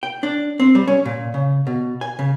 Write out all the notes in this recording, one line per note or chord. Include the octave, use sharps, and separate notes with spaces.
G5
D4
C4
G3
C#4
A#2
C#3
B2
G#5
C#3